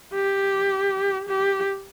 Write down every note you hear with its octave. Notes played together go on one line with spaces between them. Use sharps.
G4
G4